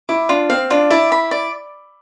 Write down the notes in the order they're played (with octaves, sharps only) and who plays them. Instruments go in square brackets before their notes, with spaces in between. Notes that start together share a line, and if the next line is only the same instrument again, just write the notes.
[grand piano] E4 [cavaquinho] D6
[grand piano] D4 [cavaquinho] F4
[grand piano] C4 [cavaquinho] F5
[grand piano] D4 [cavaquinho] F4
[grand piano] E4 [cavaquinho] D5
[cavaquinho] B5
D5